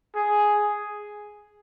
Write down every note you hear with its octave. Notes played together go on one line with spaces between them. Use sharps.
G#4